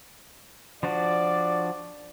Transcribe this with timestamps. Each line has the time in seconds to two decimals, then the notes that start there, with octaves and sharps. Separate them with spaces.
0.83 F3 D4 F#4 D5